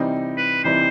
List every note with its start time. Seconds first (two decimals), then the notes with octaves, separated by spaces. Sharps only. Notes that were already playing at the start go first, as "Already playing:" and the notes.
Already playing: C3 E3 G3 C4 D#4
0.37 B4
0.64 C3 E3 G3 C4 D#4 C5